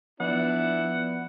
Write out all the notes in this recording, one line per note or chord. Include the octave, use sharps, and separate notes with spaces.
F3 B3 D4 E4 F#5